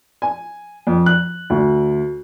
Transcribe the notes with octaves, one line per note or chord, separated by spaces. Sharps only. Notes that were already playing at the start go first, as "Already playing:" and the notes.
G#5
F2
F#6
D2